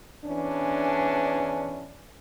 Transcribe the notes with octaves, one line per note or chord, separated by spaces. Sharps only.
E2 E3 C#4 D4